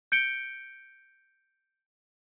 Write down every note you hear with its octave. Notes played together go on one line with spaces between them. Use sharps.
G6 C#7 D7 G7